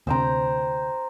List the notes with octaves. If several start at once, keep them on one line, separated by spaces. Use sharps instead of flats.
D2 C3 C5 G5 A#5